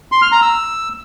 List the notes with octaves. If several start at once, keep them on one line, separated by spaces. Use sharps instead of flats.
C6
F6
A#5
E6